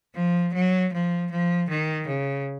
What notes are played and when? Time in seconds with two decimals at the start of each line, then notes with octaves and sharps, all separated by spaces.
0.14 F3
0.53 F#3
0.92 F3
1.31 F3
1.69 D#3
2.07 C#3